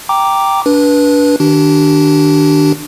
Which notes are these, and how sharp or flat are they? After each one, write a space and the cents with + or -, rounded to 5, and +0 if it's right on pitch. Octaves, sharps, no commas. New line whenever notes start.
G5 +0 A#5 +0 D6 +0
D4 -20 B4 -20
D#3 +0 D4 +0 G4 -30